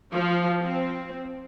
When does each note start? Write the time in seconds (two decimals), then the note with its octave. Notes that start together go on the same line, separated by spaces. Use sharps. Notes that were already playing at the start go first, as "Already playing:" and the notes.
0.13 F3
0.62 C4